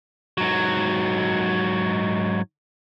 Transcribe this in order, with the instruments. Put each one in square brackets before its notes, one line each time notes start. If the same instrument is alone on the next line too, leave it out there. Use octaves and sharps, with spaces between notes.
[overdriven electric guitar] G#2 F#3